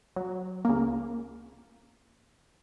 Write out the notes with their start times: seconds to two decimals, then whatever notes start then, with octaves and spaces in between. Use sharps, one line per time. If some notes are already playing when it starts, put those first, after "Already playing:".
0.16 F#3
0.65 C#2 A#3